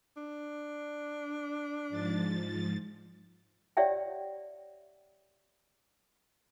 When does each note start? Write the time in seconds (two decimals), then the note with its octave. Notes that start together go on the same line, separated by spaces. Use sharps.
0.17 D4
1.89 G#2 F3 A6
3.77 G4 C#5 D5 E5 F#5 G5